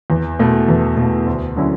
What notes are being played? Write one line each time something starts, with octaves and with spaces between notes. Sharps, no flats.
E2
B2 A3
E2
B2
A3
D2
D3 F#3 C#4 E4